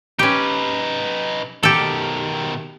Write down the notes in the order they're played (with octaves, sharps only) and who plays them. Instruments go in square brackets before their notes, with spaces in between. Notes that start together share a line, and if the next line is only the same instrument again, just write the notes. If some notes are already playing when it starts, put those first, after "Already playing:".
[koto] C#4 G4 [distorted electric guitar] D#4 B4
[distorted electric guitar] B2 D#3 [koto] G4 A4